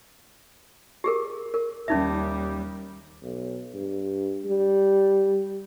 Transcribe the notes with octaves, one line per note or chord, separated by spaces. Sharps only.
G4 G#4 A#4
A#4
D#2 G3 C#4 D#4 E5
B1
G2
G3